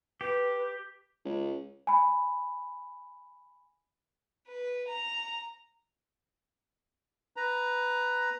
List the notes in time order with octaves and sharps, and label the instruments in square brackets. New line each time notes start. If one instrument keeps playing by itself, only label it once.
[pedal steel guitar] G4 [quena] B4
[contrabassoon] C#2
[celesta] G#5 B5
[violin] B4
A#5
[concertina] B4 A#5